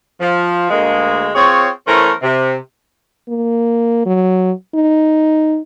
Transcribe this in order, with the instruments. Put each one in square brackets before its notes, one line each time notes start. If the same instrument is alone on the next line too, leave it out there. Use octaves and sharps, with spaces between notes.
[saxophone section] F3
D2 G#3 A#3
C4 F4 G#4 C#5
E3 A3 B3 C#4 A#4 C5
C3
[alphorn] A#3
F#3
D#4